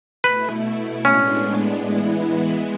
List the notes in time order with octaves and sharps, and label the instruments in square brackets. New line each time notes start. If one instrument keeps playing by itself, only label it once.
[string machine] B2 A3 E4 [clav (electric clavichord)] B4
[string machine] A2 G#3 B3 D4 [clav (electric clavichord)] C#4
[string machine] E3 G#3 B3 E4